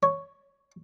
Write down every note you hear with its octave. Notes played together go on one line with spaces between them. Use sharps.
C#5